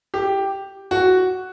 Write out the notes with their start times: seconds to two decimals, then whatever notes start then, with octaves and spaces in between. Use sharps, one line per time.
0.14 G4
0.91 F#4